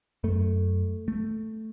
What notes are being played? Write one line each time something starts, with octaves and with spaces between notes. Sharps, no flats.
F#2 A3
A3